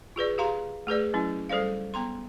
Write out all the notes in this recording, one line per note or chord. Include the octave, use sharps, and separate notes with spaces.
F4 G#4 B4 D5
G4 G#4 F5 A#5 C6
A3 G#4 B4 D5
F#3 C#4 E4
G3 A4 C5 D5 F5
B3 A#5 C6